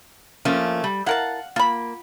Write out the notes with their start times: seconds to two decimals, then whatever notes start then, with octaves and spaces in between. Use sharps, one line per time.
0.45 F3 A3 A#3 C#4
0.84 G3
1.06 E4 A#4 F5 F#5 A5
1.56 A#3 F4 B5